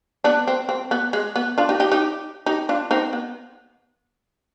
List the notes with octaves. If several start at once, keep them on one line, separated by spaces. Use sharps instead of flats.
B3 D4
C4
C4
B3
G#3
B3
D4 F4
D#4 G4
D#4 G4
D#4 G4
D#4 G4
D4 F4
C4 D#4
B3